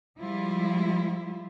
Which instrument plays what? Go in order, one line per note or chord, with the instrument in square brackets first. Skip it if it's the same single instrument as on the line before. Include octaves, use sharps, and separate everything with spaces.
[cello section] F3 G3 G#3 E4 F4